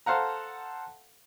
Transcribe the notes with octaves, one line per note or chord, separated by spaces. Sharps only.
A4 C5 F5 F#5 A#5